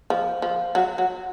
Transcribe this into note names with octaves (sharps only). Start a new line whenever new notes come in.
F3
F3
F#3
F#3